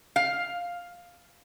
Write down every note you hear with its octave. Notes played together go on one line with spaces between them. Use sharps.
F5